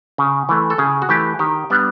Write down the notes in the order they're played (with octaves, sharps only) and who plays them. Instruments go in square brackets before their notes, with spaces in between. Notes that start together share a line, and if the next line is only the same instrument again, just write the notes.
[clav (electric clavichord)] C#3
E3 A3
A4
C#3 G#4
F#4
E3 A3 G4
D#3 G4
G3 B3 D4